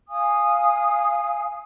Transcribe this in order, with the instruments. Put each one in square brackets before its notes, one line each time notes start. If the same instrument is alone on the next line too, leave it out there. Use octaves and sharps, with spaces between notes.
[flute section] F5 G#5 D#6